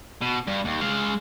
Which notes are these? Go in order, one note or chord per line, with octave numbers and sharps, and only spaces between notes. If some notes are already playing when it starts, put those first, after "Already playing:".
B2
G2
D#2
G#3 F5